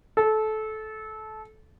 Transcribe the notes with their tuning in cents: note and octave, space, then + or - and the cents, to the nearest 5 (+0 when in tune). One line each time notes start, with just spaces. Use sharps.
A4 -20